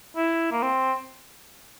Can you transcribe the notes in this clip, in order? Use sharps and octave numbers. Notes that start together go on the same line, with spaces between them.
E4
A#3
C4